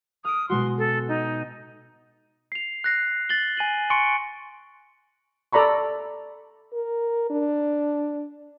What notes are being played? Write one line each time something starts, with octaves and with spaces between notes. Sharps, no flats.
D#6 F6 D7
B2 G#3 F#4 C6
A4
D#4
C7 F7
F#6 A#6 C7
A6 F#7 G7
G#5 D#7 F#7
G#5 C6 C#6 C#7 D7
A4 D5 A#5 B5 C#6
A#4
D4